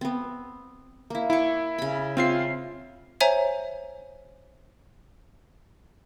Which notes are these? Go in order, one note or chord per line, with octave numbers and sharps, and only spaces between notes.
B3 C4
A#3 E4
E4 C#6 D6
C#3 B5
C4 F4 C#5 E5 F5 C7
C5 C#5 E5 G#5 A#5